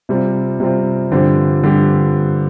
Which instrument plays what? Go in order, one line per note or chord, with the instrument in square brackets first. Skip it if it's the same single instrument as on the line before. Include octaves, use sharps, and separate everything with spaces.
[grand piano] C3 G3 C4 F4
C3 G3 C4 F4
G2 D3 F3 C4 G4
G2 D3 F3 C4 G4